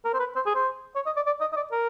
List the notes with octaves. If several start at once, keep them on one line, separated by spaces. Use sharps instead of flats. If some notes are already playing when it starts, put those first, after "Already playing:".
A#4
C5
B4
C5
G#4
C5
C#5
D#5
D5
D5
D#5
D#5
D5
A#4